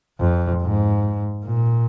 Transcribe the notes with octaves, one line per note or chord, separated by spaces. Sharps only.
F2
G#2
A#2